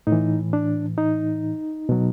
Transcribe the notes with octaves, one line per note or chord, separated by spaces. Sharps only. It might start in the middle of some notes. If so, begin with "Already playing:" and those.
A2 D#4
E3
D4
D#4
B2 F#3